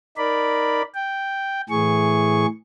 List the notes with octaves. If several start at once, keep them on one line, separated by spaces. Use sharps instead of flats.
D#4 A#4 D5 B5
G5
A2 E3 G#4 C#6